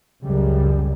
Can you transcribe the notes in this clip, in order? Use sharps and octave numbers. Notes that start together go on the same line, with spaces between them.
C#2 F#2 C#3 G3